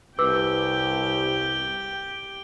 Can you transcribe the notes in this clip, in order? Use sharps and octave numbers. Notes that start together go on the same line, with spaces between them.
C2 G4 B4 G5 D6 E6